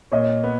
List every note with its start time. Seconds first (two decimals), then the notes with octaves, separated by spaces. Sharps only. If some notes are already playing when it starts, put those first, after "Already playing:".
0.12 A#2 C#5 D#5
0.44 B3